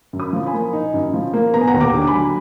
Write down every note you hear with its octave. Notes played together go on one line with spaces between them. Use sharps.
F#2
B5 D#6
F3
G#5 B5
A#3
D#4
F#2
F3
A#3
B3 A#5
G#5
F#5 A#5
D#2
A#5 D6
D3
D6
G#5 B5
F#3